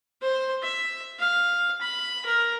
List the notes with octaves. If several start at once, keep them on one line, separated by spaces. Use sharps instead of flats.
C5
E5
F5
B5
A#4